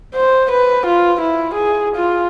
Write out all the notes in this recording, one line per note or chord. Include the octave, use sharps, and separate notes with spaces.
C5
B4
F4
E4
G#4
F4